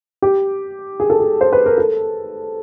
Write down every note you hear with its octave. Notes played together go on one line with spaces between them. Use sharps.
G4
G#4
A4
G#4
C5
B4
A#4
A4